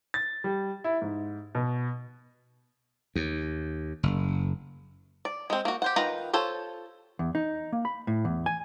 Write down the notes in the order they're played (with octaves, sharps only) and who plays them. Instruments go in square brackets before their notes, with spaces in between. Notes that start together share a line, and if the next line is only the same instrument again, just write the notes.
[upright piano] A6
G3
E4
G#2
B2
[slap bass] D#2
F#1
[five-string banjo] D5
G#3 C4
A#3 F#4
G4 C5 F#5
D#3 F4 B4 F#5 A#5
F4 A4 C5 C#5
[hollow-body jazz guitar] E2
D#4
A#3
B5
A2
E2
G#5